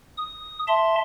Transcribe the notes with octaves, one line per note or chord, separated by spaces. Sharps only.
D#6
E5 A5 C6